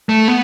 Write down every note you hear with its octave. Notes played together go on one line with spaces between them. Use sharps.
A3
B3